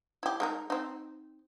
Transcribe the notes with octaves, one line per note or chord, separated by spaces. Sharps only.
E4 G4
G#3 D#4 A#4
C4 D#4